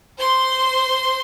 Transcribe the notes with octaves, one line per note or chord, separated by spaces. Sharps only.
C5 C6